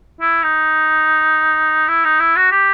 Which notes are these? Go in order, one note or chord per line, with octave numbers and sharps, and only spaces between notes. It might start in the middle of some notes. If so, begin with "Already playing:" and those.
E4
D#4
E4
D#4
E4
F#4
G4